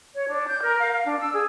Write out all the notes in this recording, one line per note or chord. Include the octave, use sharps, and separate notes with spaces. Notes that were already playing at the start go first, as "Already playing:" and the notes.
C#5
D4
G6
A#4
F5
F5
D4
E6
G#4